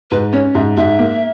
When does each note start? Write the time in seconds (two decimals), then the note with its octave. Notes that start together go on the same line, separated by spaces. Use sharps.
0.11 G#2 B4
0.33 C#4 C#5
0.55 G#2 E5
0.77 G#2 E5
0.99 A#3